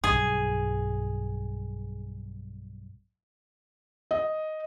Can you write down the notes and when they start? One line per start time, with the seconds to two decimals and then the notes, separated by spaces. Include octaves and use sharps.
0.04 B1 G2 G#4
4.11 D#5